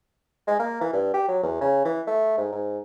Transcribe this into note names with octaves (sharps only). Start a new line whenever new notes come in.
G#3
A#3
E3
G2
G4
F#3
E2
C#3
E3
A3
G#2
G#2